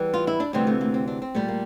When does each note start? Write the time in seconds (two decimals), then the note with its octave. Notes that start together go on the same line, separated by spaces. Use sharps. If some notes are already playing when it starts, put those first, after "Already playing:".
Already playing: E2 E3 G3
0.14 F4
0.27 E4
0.40 D4
0.53 D2 C3 E3 G3 C4
0.67 A3
0.81 A#3
0.94 C4
1.08 D4
1.22 C4
1.35 A#2 G3 A3
1.48 A#3